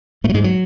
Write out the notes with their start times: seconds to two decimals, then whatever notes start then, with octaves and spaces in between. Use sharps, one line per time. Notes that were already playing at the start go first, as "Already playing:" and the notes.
0.24 A2 A3
0.29 F#3
0.34 G#2 G#3
0.44 F#3